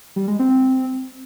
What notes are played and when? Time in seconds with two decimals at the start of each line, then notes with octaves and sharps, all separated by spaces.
0.16 G3
0.28 G#3
0.39 C4